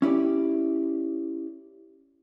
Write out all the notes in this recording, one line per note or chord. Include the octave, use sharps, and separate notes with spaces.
C#4 E4 G4 D5